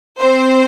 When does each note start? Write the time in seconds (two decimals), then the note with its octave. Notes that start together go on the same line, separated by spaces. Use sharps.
0.19 C4 C5